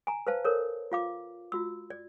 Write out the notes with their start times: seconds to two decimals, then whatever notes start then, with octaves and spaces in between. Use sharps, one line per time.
0.07 G#5 A#5
0.27 B4 C5 F5 A5
0.44 A4 A#4 C5 C#5
0.92 F4 F5 D6
1.52 F4 F#4 E6
1.90 D5